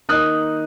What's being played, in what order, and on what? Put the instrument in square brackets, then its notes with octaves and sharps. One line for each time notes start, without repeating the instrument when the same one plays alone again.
[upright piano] D#3 A#3 D#4 [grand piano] D#6 F#6